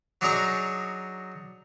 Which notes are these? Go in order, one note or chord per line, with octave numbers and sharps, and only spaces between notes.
F#3 D4 D#4 G#4 A#5 C#6